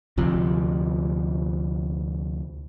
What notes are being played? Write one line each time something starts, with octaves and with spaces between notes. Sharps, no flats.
D2 C3 F3